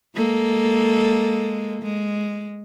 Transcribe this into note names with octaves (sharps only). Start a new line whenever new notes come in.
G#3 A#3 A4
G#3